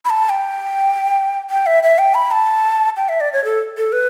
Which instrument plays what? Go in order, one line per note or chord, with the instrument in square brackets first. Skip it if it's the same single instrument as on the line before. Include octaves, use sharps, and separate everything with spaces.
[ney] B5
A5
G5
G5
E5
E5
G5
B5
A5
G5
E5
D5
C#5
A4
A4
B4